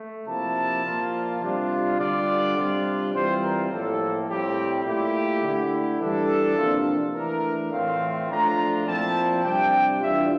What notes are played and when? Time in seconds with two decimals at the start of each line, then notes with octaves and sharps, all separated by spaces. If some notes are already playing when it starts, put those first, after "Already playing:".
Already playing: A3
0.27 C3 F3 A#3 E4 A5
0.84 A#2 F3 A#3 F4
1.42 C3 G3 D4 F4
1.99 D3 G3 D4 F4 D5
2.56 C3 G3 D4 F4
3.13 E3 G3 C4 F4 C5
3.42 A#4
3.71 A2 F3 A#3 A4
4.28 A2 G3 C4 G4
4.85 A#2 A3 E4 G4
5.42 D3 A3 E4
6.00 E3 G3 D4 A4
6.57 C3 F3 A#3 D4 F4
7.14 E3 A3 D4 A#4
7.71 A2 E3 A3 C4 F4 F5
8.29 F3 A3 D4 F4 A#5
8.86 A#2 F3 C4 E4 A5
9.44 C3 G3 D4 G5
10.01 E3 G3 D4 F4 E5